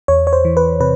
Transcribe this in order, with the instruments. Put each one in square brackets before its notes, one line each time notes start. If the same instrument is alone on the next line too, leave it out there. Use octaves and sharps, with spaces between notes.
[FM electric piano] E2 C#5
C#5
C5
E3
B4
C3 B4